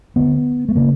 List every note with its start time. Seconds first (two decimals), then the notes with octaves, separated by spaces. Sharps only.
0.16 D2 D3 B3
0.69 A3
0.75 C#3 A#3